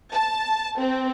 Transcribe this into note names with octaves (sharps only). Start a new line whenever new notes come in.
A5
C4